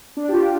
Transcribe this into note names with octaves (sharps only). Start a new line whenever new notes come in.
D4
G4
F4